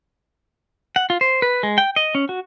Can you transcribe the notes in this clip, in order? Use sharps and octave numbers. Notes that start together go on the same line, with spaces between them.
F#5
F4
C5
B4
G#3
G5
D#5
C#4
F#4